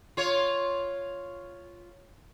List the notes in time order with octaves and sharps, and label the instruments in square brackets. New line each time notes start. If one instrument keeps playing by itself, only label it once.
[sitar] F4 C#5